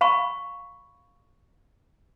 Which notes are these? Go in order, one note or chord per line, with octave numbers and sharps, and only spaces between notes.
F5 B5 C#6